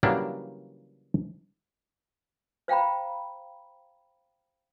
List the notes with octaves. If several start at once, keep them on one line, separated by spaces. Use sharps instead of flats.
C#3 E3 F#3 G3 A#3 D4
C5 F5 G5 A#5 B5